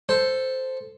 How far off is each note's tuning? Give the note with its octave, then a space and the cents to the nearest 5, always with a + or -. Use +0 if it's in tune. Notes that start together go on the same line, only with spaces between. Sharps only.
A4 +0 C5 -5